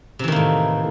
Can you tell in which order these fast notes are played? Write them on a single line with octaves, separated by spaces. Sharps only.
C3 E3 D#3 A#3 A2